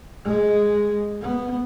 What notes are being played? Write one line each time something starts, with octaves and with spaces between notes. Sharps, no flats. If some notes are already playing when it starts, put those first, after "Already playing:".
G#3
B3